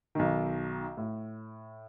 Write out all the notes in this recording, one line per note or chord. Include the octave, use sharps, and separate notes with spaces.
B1 D#3
A2